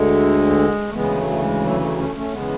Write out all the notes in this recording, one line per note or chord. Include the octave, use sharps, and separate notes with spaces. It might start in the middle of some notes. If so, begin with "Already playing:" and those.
Already playing: D2 D3 G#3
A3
D2 C#3 E3 G#3 B3
F#3 A3
A3
G#3
F#3 A3
F#3 A3
A3 C#4
A3 C#4
C#3 E3 G#3 B3